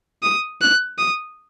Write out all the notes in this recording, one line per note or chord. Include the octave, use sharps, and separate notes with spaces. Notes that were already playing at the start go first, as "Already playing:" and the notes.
D#6
F#6
D#6